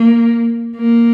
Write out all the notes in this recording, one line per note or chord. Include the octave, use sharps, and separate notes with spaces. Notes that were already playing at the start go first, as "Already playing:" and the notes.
Already playing: A#3
A#3